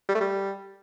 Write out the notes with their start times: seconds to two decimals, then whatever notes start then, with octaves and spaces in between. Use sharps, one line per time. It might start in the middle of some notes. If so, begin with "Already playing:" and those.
0.09 G3
0.15 A3
0.21 G3